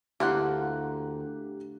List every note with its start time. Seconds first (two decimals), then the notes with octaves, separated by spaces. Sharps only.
0.20 D2 A#3 E4 F4 G4 F#5 F#6